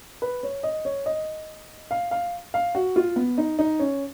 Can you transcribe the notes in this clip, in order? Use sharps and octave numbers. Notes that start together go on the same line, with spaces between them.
B4
C#5
D#5
C#5
D#5
F5
F5
F5
F#4
F4
B3
D#4
D#4
C#4